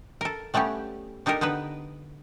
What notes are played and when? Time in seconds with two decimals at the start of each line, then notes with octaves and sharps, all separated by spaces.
0.21 A4 A#4
0.54 G3 A3 B3 C#4 G4
1.26 D4 D#4 G4 A4 A#4
1.41 D3 B3 D#4 B4